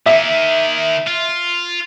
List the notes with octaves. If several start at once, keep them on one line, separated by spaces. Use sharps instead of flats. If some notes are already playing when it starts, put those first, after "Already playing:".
D#3 A#3 E5
F4